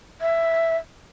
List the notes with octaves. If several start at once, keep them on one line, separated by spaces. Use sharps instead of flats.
E5